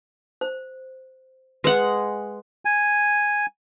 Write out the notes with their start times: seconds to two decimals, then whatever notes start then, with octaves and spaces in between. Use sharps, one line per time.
0.41 C5
1.64 G#3 B4 F#5
2.65 G#5